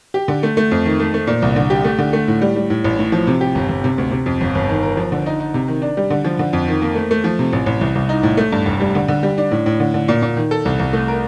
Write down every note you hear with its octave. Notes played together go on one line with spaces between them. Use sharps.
G4
D3
A3
A3
F2
D#3
A3
A3
A#2
C2
D3
G4
A3
D3
A3
A2
G3
G3
A2
A1
A2
F3
C3
G4
G1
G1
C3
D2
C3
F2
G1
G1
D#3
A#4
F3
D3
D#4
D#4
C3
D#3
D4
G3
D3
F3
D3
F2
D#3
A#3
A3
A3
F3
C3
A1
A1
C2
C2
D#4
A2
A3
G2
F1
G3
D3
D3
G3
D4
A2
A2
D3
D3
A#2
A#2
D#3
A4
C2
C2
A3
A#4